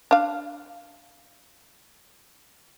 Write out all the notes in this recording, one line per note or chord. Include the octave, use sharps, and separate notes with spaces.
D4 F5